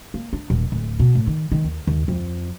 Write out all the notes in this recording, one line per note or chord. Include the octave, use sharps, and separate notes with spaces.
A#3
D4
D#1
D1
B2
A2
D#3
D#3
D#2
D#2
F2